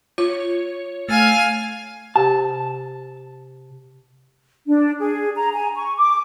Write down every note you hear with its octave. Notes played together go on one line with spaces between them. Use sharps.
F4 C#5
A3 F5 G#5 F6
C3 G4 A5
D4
G#4
A#5
G#5
C#6
D6